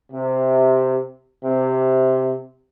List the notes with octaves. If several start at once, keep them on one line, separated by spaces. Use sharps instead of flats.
C3
C3